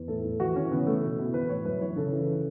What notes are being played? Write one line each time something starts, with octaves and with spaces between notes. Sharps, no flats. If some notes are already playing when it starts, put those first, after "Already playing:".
Already playing: E2
A2 A4
A2
E3 F#4
E3 C#4
C#3 B3
E3 A3
B2
B2 E4
E3 B4
A2 C#5
F#2 B4
E3 C#5
C#3 A4
E3